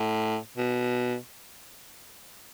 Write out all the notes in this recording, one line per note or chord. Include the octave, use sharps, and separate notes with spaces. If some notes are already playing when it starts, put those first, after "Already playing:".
Already playing: A2
B2